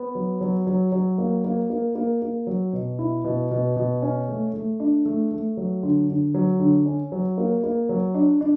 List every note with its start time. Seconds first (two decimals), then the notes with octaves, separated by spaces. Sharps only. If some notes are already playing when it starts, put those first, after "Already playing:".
Already playing: B3
0.15 F#3
0.41 F#3
0.67 F#3
0.92 F#3
1.18 A#3
1.45 A#3
1.70 A#3
1.95 A#3
2.22 A#3
2.47 F#3
2.73 B2
2.99 E4
3.24 B2
3.51 B2
3.76 B2
4.02 C#4
4.28 A3
4.53 A3
4.80 D4
5.06 A3
5.31 A3
5.57 F#3
5.83 D3
6.09 D3
6.34 F#3
6.60 D3
6.86 C#4
7.12 F#3
7.38 A#3
7.64 A#3
7.89 F#3
8.14 D4
8.41 D4